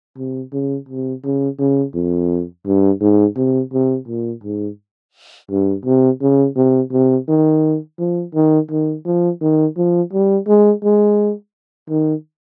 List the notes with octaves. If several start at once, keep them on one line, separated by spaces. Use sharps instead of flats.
C3
C#3
C3
C#3
C#3
F2
G2
G#2
C3
C3
A#2
G#2
G2
C3
C#3
C3
C3
D#3
F3
D#3
D#3
F3
D#3
F3
G3
G#3
G#3
D#3